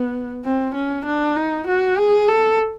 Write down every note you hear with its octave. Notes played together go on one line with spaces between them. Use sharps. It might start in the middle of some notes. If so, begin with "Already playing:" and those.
Already playing: B3
C4
C#4
D4
D#4
F#4
G#4
A4